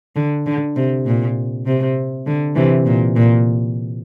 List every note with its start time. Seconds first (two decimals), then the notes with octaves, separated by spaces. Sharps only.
0.16 D3
0.46 D3
0.76 C3
1.06 A#2
1.66 C3
2.26 D3
2.55 C3 E3
2.86 A#2
3.16 A#2